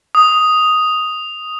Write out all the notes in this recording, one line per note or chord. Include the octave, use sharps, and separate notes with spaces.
D#6